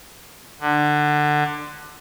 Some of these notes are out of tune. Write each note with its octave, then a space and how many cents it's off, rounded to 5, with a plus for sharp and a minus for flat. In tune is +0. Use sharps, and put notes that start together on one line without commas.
D3 +20